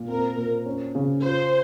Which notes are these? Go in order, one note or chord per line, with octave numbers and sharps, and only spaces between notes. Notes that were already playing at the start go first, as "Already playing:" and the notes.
Already playing: A#2
C4 A#4
A#2
C#4
C#3
F4 C5